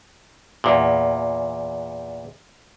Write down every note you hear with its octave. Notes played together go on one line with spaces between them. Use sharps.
E2 A#2